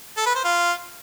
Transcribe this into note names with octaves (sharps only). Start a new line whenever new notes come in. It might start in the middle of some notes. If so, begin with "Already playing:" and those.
A4
B4
C5
F4